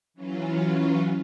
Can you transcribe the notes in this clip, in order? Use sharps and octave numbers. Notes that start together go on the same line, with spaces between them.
E3 F#3 C#4 F4